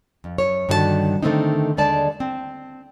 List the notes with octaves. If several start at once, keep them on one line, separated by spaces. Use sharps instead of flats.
F2
F#2 C#5
G2 D3 D#3 F#4 C5 A5
D3 D#3 A3 C4 D4 D#4
D#2 D3 G#3 D5 A5
C4